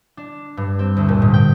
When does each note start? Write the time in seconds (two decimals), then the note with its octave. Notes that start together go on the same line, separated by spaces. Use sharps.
0.17 D4
0.57 G2
0.79 C4
0.97 D2
1.08 A#2
1.22 G#2
1.34 G5